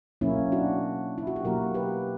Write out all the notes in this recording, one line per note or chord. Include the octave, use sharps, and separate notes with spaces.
B2 F#3 A#3 C#4 E4
D4 F#4
E4
F#4
G4
B2 F#3 A#3 F#4 A#4
G4 B4